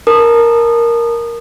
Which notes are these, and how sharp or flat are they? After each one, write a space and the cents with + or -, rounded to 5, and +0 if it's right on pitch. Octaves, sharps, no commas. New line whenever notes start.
A#4 +0 A5 -10 D#6 -25